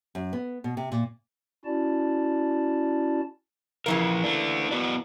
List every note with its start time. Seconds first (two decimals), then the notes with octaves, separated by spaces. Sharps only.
0.15 F#2
0.33 B3
0.64 B2
0.77 C3
0.92 A#2
1.65 C#4 E4 F#4 D5 A5
3.86 C#3 E3 F3 A#3 A#4
4.24 A3 D4
4.71 B3 F#4 D5